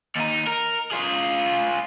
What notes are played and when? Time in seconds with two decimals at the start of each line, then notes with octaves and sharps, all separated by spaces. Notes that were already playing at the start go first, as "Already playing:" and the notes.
0.16 D#2 D#4
0.47 A#4
0.92 F4 G#4